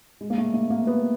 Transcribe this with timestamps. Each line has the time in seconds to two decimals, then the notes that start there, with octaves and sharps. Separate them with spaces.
0.21 G#3
0.30 A#3
0.38 A3
0.54 A3
0.70 A#3
0.87 B3